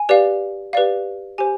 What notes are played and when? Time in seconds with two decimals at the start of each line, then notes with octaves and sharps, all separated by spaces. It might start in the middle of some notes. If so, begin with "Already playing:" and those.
Already playing: G#5
0.09 G4 B4 D5 F5
0.73 G4 B4 D5 F5
1.38 G4 C5 G#5